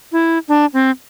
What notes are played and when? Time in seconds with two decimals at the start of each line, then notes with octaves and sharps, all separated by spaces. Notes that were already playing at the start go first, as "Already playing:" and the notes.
0.12 E4
0.48 D4
0.73 C4